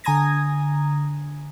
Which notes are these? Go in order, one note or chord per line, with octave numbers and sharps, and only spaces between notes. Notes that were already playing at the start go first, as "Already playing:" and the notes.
D3 G#5 A#5 D#6 G#6 A#6